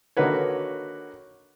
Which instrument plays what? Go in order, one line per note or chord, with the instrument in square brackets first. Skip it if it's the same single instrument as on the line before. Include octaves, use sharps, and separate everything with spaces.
[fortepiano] D3 D#3 A#3 F#4 B4 C#5